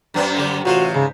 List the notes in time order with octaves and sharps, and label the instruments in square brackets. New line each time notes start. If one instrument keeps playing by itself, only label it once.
[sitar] F#2 B3 C4
[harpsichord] D3 G3 G4
[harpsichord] A1 F4 A4 [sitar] C3 [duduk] F#4
[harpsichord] G#2 [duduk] C#3